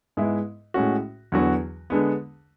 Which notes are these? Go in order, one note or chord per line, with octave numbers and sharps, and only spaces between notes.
G#2 G#3 B3 E4
A2 G#3 C#4 F#4
E2 D3 F#3 B3 F#4
D3 G#3 B3